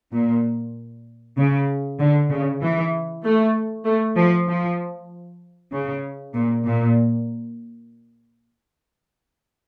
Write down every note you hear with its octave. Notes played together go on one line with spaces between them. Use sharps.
A#2
C#3
D3
C#3
E3
A3
A3
F3
F3
C#3
A#2
A#2